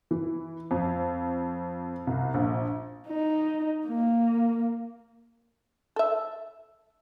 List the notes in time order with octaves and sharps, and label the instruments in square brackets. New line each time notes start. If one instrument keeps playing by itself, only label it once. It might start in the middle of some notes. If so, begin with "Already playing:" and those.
[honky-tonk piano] E3
F2
C2
A#1
[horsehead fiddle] D#4
A#3
[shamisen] A4 E5